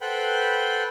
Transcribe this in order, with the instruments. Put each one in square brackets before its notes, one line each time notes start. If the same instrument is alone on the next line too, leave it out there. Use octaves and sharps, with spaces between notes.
[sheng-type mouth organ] A4 B4 C5 F#5 G5 B5